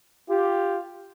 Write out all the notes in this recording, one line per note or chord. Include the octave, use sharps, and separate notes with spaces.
F4 G4